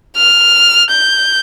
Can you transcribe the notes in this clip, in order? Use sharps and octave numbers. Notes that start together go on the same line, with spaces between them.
F6
G6